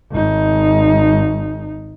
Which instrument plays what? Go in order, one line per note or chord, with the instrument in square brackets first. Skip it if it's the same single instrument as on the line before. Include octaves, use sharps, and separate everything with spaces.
[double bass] G#1 D#4